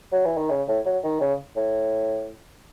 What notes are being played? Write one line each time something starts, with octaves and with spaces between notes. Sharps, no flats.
F#3
E3
D#3
C#3
A2
F#3
D#3
C#3
A2